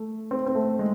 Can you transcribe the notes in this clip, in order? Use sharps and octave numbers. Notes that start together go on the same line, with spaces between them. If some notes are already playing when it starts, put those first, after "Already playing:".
Already playing: A3
C4
C4
A3
G#3